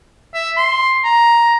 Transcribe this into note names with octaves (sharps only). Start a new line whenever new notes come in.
E5
C6
A#5